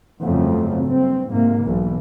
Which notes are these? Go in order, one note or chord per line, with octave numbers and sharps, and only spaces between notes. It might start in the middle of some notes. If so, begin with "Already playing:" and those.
G1 F2 C#3 F#3 A3 C4
F#1 G2 C4
G#2 C3 A#3
B1 E3